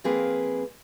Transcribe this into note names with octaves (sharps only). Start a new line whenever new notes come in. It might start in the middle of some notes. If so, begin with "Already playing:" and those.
F3 A#3 C4 G#4 A#4 B4